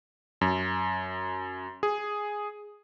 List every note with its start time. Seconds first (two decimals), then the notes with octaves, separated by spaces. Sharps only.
0.41 F#2
1.83 G#4